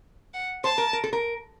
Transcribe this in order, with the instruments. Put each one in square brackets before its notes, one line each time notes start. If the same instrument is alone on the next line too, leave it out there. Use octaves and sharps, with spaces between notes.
[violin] F#5
[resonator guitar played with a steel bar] C5 [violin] A5
[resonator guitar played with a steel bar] A#4
A#4
A4
A#4